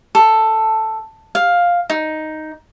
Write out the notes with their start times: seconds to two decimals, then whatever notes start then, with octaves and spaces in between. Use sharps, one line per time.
0.15 A4
1.35 F5
1.90 D#4